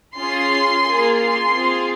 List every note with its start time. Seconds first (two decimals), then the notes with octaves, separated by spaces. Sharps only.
0.16 C#4 F4 G#4 C6
0.83 A#3 F4 G#4
1.17 C6
1.50 C4 F4 G#4